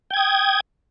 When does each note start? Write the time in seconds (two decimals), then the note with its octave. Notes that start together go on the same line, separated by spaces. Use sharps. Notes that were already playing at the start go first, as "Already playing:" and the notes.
0.11 G5
0.14 G#6
0.17 D#6